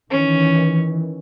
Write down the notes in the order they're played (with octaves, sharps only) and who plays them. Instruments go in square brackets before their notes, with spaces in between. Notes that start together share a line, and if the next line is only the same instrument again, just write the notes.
[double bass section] D#3 E3 [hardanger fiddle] C#4